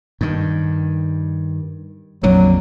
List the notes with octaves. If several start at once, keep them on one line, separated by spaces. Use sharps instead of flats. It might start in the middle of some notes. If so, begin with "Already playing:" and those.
G2 D#3
A#1 F2 D3 F#3